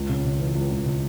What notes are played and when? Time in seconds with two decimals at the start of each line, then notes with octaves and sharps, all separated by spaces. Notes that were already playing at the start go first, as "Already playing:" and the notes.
Already playing: C#2
0.09 C#3
0.25 C#3
0.39 E3
0.55 C#2
0.70 C#2
0.85 C#3